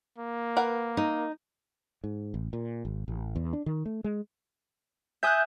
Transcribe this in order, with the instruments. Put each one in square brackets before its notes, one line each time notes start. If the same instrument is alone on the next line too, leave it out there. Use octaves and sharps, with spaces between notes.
[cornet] A#3
[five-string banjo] A#4 B4 F#5
[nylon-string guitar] D#4
[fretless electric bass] G#2
A1
A#2
G#1
A1
E2
D4
D#3
A3
G#3
[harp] E5 G#5 D#6 [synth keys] F#6 G6